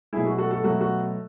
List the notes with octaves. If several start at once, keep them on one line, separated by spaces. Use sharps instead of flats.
B2 F#3 A3 E4 G#4
F#4
F#4 A4
F#4 A4
B2 F#3 A3 F#4
F#4